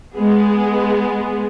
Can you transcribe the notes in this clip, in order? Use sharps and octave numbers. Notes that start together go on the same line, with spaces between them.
G#3 B3 G#4